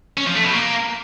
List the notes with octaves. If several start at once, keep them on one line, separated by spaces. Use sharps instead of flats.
C#4
F3
A3
B2
A#3